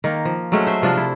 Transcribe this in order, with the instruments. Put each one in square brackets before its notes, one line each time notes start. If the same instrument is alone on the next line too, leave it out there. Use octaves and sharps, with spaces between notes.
[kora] D#3 A#3
F3
F#3 G#3 A3 C#4
C5 E5
C3 F3 D4 F4
E4